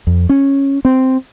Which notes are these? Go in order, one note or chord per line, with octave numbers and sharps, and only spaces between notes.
F2
C#4
C4